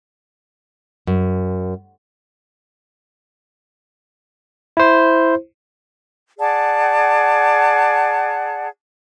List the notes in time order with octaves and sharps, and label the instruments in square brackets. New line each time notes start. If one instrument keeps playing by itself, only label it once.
[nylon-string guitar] F#2
[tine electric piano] E4 C5
[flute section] G#4 D5 F#5 A5